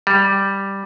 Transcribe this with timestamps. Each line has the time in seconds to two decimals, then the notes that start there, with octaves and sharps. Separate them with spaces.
0.07 G3